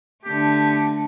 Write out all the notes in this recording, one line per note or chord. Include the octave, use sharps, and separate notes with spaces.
D3 A3 G4